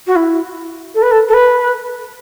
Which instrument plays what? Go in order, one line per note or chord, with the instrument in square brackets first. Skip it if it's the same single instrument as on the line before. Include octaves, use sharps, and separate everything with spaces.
[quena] F#4
E4
A4
B4
A4
A4
B4